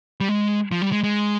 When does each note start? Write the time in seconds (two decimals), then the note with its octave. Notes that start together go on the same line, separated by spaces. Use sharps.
0.20 G3
0.29 G#3
0.72 F3
0.82 G3
0.92 G#3
1.03 G#3